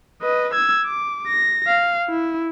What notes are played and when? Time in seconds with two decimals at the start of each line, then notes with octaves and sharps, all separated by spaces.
0.22 B4 D#5
0.54 E6 G#6
0.85 D6
1.28 A#6
1.68 F5
2.09 E4